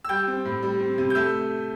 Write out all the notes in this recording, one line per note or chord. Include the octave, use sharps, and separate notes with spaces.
E6
G3 G5 G6
C4
A2
G3
C4
C3
G6
A3 E5 E6